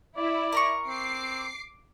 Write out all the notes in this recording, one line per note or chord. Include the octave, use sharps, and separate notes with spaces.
E4 D5
A#4 A#5 C#6
C4 D6 C7